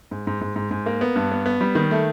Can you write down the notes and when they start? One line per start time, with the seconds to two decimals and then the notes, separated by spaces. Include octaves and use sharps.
0.11 G#2
0.27 G#2
0.41 G#2
0.56 G#2
0.71 G#2
0.86 A#3
1.01 B3
1.16 G2
1.31 B3
1.46 B3
1.61 G3
1.75 D#3
1.91 A3